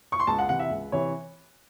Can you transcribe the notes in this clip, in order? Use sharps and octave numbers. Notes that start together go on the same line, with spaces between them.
C#6
C6
C#2 A5
F#5
C3 E3 F#5
E5
C#2
C3 E3 C#5